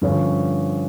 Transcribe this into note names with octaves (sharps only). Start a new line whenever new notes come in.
G2 D3 F3 C#4